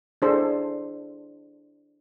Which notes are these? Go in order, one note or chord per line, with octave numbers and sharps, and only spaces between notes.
D4 E4 G#4 A4 C5